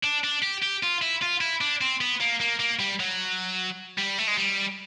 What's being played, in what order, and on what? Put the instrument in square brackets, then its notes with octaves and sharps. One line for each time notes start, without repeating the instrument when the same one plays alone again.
[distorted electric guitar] D4
D4
G4
G4
F4
E4
F4
E4
D4
C4
B3
A#3
A#3
A#3
G3
F#3
G3
A3
G#3
G3